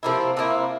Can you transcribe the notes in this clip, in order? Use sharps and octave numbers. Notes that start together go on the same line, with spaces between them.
C3 F3 A#3 E4
C3 F3 A#3 E4